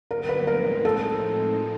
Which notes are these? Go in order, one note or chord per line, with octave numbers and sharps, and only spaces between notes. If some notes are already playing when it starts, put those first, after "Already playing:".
G2 D3 F#3 B3 A#4
B4
A2 F3 G#3 C4 D#4 A#4
A4